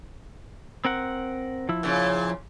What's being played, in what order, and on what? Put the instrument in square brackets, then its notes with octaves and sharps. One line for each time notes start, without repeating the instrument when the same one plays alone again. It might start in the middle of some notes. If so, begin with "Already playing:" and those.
[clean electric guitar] C4 A#4 F#5
F3 E4
[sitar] A#2 C#3